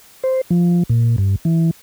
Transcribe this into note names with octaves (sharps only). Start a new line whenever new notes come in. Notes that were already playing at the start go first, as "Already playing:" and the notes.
C5
F3
A#2
G2
E3